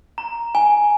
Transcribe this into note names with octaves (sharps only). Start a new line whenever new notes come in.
A#5
G#5